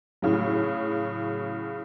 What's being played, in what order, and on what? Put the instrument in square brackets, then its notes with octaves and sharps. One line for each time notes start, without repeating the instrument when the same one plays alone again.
[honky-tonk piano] A2 C#3 F#3